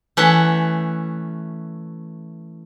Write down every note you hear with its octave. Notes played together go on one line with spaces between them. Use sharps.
E3 A3 C#4 F#5